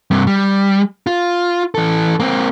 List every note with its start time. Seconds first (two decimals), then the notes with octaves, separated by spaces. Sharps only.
0.11 G2 C3
0.27 G3
1.07 F4
1.75 E3 A4
2.20 A#3 C4